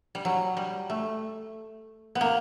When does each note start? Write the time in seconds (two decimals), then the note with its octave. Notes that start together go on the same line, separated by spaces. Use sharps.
0.15 G3
0.25 F#3
0.57 G3
0.90 A3
2.15 B3
2.21 A#3